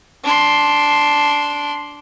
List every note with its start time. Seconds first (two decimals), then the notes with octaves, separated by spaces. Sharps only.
0.24 D4 C6